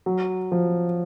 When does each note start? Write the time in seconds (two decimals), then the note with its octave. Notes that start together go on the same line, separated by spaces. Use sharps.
0.06 F#3
0.52 F3